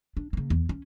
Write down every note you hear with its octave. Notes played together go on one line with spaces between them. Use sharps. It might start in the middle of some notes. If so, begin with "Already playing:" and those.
D4
C#3 A#3
E2
C#4